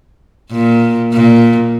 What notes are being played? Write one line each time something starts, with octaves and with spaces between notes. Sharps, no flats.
A#2
A#2